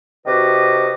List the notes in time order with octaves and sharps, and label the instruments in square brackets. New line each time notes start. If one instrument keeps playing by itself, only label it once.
[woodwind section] C3 D#3 F#4 B4 D#5 D6